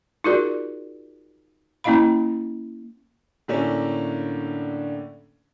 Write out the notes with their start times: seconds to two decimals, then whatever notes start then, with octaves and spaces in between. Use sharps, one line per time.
0.24 D#4 F4 F#4 G#4 A#4 D5
1.84 A#3 C#4 E4 D#5 F5 B5
3.48 A2 D3 A3 A#3 C#4 D4